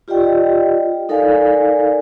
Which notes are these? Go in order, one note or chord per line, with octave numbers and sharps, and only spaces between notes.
F4 G4 D5 D#5 G5
D#4 A4 A#4 D5 F5 G#5